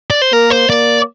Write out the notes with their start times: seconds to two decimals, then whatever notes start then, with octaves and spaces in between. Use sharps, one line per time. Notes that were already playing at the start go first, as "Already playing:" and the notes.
0.10 D5
0.22 C5
0.32 A#3 A#4
0.50 C5
0.69 A#3 D5